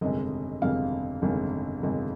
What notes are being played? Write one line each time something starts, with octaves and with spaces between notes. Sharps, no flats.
G1 F2 C3 D#3 G#3 D#5
G1 F2 C3 D#3 G#3 F5
G1 F2 C3 D#3 G#3
G1 F2 C3 D#3 G#3